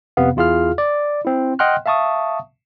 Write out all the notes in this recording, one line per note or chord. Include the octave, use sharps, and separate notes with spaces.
F2 C3 B3 F5 F#5
E2 E4 F4 G#4 F5 F6
D5
C4 E4
D#5 F#5 G5 C6 F6 F#6
E5 F5 A5 C#6 D#6